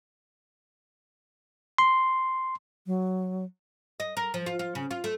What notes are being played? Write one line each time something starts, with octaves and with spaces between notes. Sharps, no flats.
C6
F#3
D#5
A#4
F3
F4
F4
C#3
F4
A3